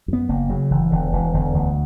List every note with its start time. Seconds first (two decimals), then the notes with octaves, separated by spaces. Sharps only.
0.08 F#2 B3
0.29 F#1 A#3
0.50 C#3 F#3
0.71 F#1 E3
0.92 E1 D3
1.13 E1 E3
1.34 E1 D3
1.54 D2